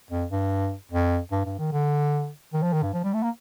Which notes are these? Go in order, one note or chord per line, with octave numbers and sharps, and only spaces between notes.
F2
G2
F2
G2
G2
D#3
D3
D#3
F3
D#3
G2
F3
G3
A3
A#3